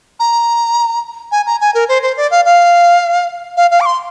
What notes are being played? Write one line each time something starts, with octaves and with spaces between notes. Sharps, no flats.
A#5
G#5
A#5
G#5
A#4
C5
C5
D5
F5
F5
F5
F5
D6
C6